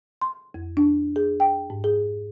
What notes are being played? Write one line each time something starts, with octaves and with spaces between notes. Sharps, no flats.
C6
F2
D4
G#4
G5
G#2
G#4